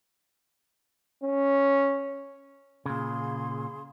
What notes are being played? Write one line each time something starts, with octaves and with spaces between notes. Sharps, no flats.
C#4
A#2 C#3 G#4 F5 C6